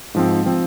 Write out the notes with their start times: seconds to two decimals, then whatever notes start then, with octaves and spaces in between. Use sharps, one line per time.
0.14 G#2 F3 C4
0.46 F3 C4